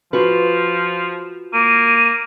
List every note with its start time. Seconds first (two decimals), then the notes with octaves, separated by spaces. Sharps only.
0.13 F3 F4 F#4 B4
1.53 A#3 D#7